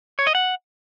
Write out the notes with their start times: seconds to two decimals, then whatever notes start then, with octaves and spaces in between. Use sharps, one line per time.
0.19 C#5
0.27 D#5
0.35 F#5